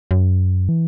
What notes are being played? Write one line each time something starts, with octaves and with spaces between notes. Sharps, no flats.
F#2
E3